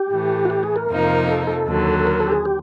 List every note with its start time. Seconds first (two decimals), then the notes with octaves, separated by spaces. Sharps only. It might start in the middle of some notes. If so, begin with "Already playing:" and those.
Already playing: G4
0.10 A2 E3 A3
0.45 F#4
0.50 G4
0.63 G#4
0.76 A#4
0.89 F2 C3 F3 A#3 D#4
1.28 A4
1.47 A4
1.67 D#2 D3 F#3
2.00 A4
2.07 A#4
2.20 A4
2.27 G4
2.32 G#4
2.45 G4